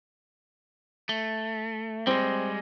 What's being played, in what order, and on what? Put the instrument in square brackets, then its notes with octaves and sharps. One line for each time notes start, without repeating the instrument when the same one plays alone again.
[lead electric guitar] A3
[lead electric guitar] G3 G#3 [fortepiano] C4